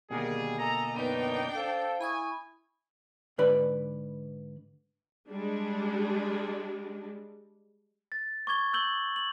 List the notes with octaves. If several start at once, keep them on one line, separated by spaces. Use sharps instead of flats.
B2 D3 D#3 G3 A#3 G#4
A4 D#5 G#5 A#5
F#2 B3 D4 D#4 B4 G5
A4 C5 F5
E4 G#5 B5 C#6 D#6
G#2 D3 B4 D5 B5
G3 G#3 D4
A6
C#6 D6 G#6 G7
E6 G6 F#7 G7
F#7